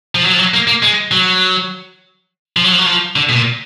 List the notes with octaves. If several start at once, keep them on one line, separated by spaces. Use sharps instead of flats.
F3
F#3
F3
F#3
A#3
A#3
G#3
F#3
F3
F#3
F3
F#3
F3
D3
B2
A#2